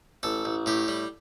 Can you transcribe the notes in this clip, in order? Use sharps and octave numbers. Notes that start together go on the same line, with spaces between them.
A1 A4
A1
A2 G4
G3